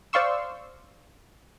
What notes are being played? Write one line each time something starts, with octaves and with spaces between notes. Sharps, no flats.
C5 D5 F5 C6 C#6 E6